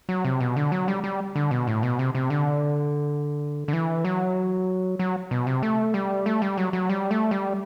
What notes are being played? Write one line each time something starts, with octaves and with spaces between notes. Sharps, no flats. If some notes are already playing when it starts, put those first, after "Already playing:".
F#3
C3
B2
D3
F#3
G3
G3
D3
B2
A2
B2
C3
C3
D3
D3
E3
F#3
F#3
B2
C3
A3
G3
A3
G3
F#3
F#3
G3
A3
G3